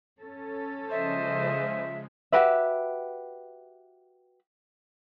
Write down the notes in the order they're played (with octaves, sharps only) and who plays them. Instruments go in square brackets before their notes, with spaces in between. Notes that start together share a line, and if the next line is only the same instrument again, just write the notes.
[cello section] C#4 A4
[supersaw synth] C#3 F3 G#3 [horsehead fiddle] C5 D#5 [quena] E5
[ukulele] F#4 G4 B4 E5